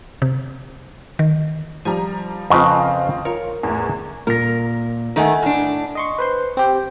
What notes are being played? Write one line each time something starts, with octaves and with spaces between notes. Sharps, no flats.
C3
D#3
F3 G3 G#5 A#5
F2 C#3 C4 F4 B4 D#5
F4 A#4 C#5
E2 A2
A#2 A#4 A#6
D#3 A3 D#5 F#5 G#5
A2 D4
D#5 C6 C#6
B4 C5 C6
C4 G4 G5